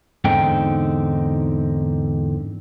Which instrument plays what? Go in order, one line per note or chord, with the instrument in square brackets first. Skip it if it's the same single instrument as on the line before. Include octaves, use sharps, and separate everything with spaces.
[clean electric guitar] E2 G#2 D3 C4 D#4 G5